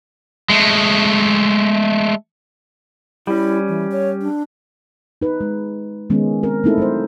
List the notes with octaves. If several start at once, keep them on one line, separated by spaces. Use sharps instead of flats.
G#3 A3
G3 C#4 E4
E3
C#5
D4
D#4 B4
G#3
D#3 G#3 B3 C#4
C4 A#4
A3 A#3 C4 D#4 E4 A4
F#3 A3 C5